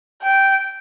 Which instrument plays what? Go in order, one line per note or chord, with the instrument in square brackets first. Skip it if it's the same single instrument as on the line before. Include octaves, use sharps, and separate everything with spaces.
[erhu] G5